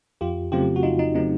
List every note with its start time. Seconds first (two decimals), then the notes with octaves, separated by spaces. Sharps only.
0.21 F2 F4 G4
0.52 C#3 F#3 A3 C4 F4 G4
0.76 F#4
0.83 F2 D#4 F4
0.99 D#4
1.14 C#3 F#3 A3 C4 D#4